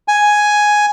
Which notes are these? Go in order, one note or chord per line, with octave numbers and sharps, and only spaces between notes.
G#5